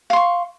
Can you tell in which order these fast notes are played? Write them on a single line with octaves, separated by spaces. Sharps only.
F5 C6 C#6